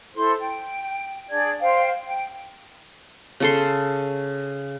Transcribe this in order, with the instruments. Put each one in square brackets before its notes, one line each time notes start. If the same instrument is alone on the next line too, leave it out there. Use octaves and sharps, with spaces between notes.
[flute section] E4 A4 C5 C6
G5
D4 G#4 D5 G#6
C5 F5 G5
G5
[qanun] C#3 A4 C6